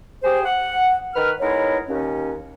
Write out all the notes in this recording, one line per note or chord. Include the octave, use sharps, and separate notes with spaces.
G4 G#4 C5
F#5
D#3 B4 F6
G#3 B3 D#4 E4 A#4 C#5
D#2 C#4